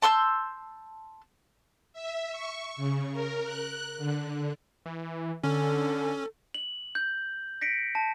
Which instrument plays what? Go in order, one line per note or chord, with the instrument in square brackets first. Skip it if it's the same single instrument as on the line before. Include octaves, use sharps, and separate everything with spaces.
[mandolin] A5 C6 E6 G6
[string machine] E5
C#6
C#3
A#4
F#6
D3
[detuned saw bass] E3
[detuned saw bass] D3 [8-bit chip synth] C#4 [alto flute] A4
[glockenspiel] F#7
G6
A#6 B6 C#7 D7
A5